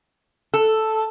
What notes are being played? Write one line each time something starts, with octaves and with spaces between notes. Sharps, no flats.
A4